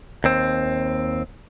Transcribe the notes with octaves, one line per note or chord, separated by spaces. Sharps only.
D#2 C4